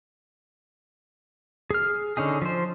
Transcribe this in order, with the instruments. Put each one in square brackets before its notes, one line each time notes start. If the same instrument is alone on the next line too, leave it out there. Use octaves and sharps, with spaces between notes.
[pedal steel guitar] G#4 F6
D3 C#4 D#4 G#4
F3 C5